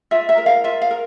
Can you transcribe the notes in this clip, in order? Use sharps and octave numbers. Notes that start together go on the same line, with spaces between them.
F4 E5
E5
A#4
F5
F4 E5
F5
A#4